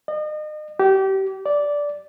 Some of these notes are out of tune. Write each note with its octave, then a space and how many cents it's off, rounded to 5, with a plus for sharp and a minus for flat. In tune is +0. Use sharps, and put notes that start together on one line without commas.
D#5 -35
G4 -25
D5 -10